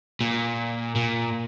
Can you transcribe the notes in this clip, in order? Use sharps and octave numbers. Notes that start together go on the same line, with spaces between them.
A#2
A#2